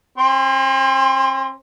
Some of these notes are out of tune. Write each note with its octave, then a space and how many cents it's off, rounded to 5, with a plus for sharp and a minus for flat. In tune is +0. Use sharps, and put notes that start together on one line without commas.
C4 +45 C5 +0